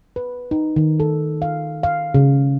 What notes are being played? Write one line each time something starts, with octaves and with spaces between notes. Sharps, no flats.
B4
D#4
D#3
A4
F5
F5
C#3